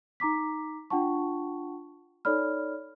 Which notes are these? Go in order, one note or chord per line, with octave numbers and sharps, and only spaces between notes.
D#4 A#5 D6 B6
D4 F4 F#5 G5 A5 C#6
D#4 A4 C#5 D5 B5 F6